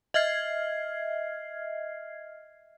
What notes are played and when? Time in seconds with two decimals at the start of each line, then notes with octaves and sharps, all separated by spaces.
0.14 D#5 E5 F6 G#6 C7